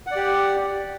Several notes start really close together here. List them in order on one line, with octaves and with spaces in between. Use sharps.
F#5 D5 G4